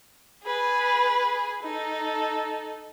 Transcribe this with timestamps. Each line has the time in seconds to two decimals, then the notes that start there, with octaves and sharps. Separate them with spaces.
0.43 G#4 B4
1.63 D#4 A4